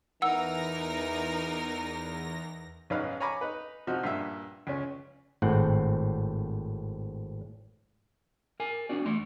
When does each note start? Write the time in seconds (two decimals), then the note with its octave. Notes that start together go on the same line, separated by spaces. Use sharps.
0.22 E2 E3 D#4 A#4 F#5 E6 A#6
2.90 B1 G#2 C#4 D#4 B4 F5
3.20 C#5 G#5 A#5 B5 D6
3.41 D#4 B4
3.87 C3 F3 D#4 F#4
4.03 G2 A#2 E5
4.67 C#2 C#4
5.42 G#1 A2 C4 F#5 G5
8.60 A#4 G#5
8.89 C4 D4 F#4 D5
9.05 E2 A3 C6